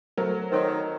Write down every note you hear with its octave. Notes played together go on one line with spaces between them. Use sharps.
F#3 A3 A#4 C5
D#3 D#4 A#4 C5 C#5 D#5